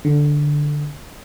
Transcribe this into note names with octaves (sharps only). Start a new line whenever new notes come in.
D3